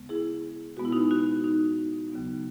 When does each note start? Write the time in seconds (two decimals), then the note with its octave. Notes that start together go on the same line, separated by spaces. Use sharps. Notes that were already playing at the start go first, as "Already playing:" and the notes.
Already playing: D#2 C#3 G#3 B3
0.09 E4 G#4
0.77 B2 G#3 B3 F#4
0.85 E4
0.93 D#4 F#4
1.11 D#4 F#4
1.44 D#4
2.12 D#2 C#3 F#3 B3